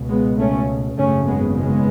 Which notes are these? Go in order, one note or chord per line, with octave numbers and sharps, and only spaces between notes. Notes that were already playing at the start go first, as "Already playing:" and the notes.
Already playing: C#2 B2
G#3 B3
A3 C#4
G#1 F#2 C#3 A3 C#4
G#3 B3
G#3 B3